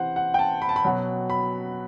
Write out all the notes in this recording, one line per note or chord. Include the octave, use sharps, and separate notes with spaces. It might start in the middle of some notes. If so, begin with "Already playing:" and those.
Already playing: C3 E3 C5 F#5
F#5
G5
A5
B5
A5
B5
B2 F#3
B5